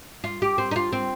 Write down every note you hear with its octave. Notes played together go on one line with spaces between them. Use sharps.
F4
G4
C4
D#4
F4
C4